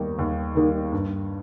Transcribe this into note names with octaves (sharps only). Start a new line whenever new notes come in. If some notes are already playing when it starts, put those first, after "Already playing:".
Already playing: D#2 D#3 G3 A#3 D#4
D#2
D#3 G3 A#3 D#4
G2